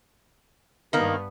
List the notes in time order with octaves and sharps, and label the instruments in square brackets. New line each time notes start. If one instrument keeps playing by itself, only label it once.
[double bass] G2 B3 [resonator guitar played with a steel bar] D#3 A#3